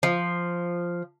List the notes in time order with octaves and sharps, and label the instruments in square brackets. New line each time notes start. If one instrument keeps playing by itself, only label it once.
[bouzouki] F3